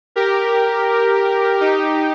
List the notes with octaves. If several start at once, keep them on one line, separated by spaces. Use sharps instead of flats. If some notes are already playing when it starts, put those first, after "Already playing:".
G4 A#4
D#4 G4